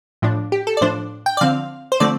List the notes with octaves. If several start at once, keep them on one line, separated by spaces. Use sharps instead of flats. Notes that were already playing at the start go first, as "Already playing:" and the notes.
A2 F3 D4
G4
A4
D5
A2 F3 D4 C5
G5
D5
D3 F3 C4 F5
C5
D3 F3 A3 C4 D5